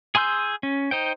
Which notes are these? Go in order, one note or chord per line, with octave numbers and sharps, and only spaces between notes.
G#4 G#5 C6 E6 G6
C#4
D#4 C5 G5